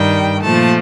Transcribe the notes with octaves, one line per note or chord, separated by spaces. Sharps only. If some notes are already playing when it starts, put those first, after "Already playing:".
Already playing: G2 D#3 G3 G5
A#2 F3 A3 A5